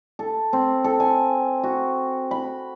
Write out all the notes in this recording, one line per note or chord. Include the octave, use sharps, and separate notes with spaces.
A4
C4
A4
G#5
F#4
B5